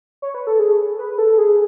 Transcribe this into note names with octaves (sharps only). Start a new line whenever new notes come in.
C#5
B4
A4
G#4
B4
A4
G#4